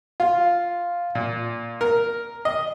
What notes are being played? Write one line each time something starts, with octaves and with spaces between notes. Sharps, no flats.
F4
A#2
A#4
D#5